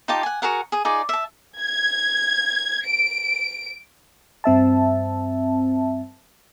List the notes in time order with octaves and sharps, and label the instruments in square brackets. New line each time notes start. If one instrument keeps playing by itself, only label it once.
[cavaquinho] D#4 F4 G4 A5
F#5 G#5
F#4 G#4 A#4 F#5
G#4 D#6
D#4 F4 G#4 D5
E5 A5
[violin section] G#6
D7
[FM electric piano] G2 C4 E5 A5